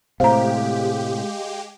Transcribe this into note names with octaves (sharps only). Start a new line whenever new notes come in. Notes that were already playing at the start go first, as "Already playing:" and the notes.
A2 C3 G#3 G4 C5 F5 A#5